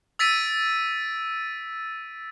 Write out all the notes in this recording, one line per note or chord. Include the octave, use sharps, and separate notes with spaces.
E6 A6 B6 D7 D#7